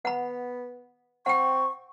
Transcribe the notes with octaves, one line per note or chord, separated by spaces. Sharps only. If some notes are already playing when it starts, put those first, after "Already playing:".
B3 F#5 B5
C4 F#5 G5 C#6